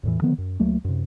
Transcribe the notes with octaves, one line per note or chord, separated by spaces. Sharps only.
E2 A2 E3
D3 D#3 F3 B3
F#2
C#2 F#3 A3 A#3
F#2 C3